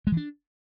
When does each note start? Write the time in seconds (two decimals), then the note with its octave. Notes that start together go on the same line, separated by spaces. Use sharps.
0.07 G#3
0.12 E3
0.17 D4